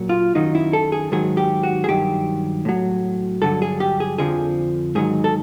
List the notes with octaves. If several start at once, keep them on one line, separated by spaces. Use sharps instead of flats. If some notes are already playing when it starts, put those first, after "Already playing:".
Already playing: A#2 F#3
F4
F#2 D#3 F#3 D#4
E4
A4
G#4
G#2 D#3 F#3 G#4
G4
F#4
G#4
G2 D#3 F#3 G4
A2 F#3
G2 D3 F#3 A4
G#4
G4
G#4
F2 D3 F3 G#4
G#2 D#3 F#3 G#4
A4